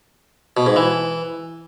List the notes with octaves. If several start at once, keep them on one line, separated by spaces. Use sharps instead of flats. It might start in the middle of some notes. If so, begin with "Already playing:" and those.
B2
G#2
E3